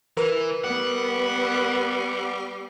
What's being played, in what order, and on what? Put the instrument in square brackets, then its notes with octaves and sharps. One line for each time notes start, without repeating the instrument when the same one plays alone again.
[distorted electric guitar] E3 [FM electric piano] A#4 B4
[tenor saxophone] G3 [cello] B3 [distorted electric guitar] F#5